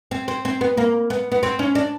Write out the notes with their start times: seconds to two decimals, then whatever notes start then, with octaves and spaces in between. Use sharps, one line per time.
0.11 C4
0.28 C4
0.45 C4
0.61 B3
0.77 A#3
1.10 B3
1.32 B3
1.43 C4
1.59 C#4
1.75 D4